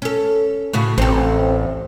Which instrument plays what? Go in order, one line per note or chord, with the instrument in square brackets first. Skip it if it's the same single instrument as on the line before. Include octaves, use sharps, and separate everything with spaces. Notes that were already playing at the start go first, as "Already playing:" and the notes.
[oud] C#4 A4
A2 C#3 F#4
[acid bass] A1 [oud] C4 A4